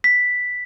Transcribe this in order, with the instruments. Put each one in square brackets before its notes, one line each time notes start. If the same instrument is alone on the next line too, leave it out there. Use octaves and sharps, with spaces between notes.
[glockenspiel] B6